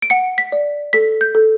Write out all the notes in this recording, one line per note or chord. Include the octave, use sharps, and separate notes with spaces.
D7
F#5 C#7
B6
D5
A4 B6
G6
A4